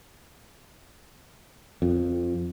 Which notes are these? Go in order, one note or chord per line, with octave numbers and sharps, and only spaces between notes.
F2